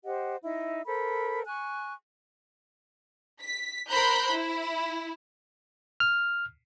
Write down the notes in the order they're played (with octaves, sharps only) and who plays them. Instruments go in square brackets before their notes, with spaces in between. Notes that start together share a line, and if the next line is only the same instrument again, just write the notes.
[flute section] G4 C5 D#5 F#5
D#4 E4 E5
A4 A#4 C5 B5
G#5 C#6 F#6
[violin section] B6
A#4 C5 A#5 B5 F#6 G6
E4
[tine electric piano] F6